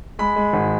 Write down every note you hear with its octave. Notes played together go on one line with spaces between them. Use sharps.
G#3 B5
G#3
G#1